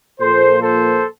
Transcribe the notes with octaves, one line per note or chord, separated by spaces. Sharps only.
A#2 F3 A#3 A4 C5
A4 C5